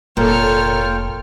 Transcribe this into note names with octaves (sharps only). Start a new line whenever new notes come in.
F1 A#2 F4 A4 C#5 G5 F6